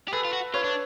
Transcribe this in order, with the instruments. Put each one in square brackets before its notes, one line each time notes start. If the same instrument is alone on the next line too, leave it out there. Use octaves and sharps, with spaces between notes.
[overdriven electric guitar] G4
[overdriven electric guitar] G#4 [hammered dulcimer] A4 B4
[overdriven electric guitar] F4
F#4
[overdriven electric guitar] F4 [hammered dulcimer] B4 C#5
[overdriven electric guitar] D4